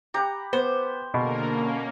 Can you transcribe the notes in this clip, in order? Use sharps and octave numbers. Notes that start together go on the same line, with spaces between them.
G4 F#5 A#5 B5
B3 C5
B2 D3 A#3 G#4 A#4 F5
A#3 C#4 A5